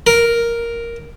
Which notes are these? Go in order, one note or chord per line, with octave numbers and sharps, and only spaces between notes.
A#4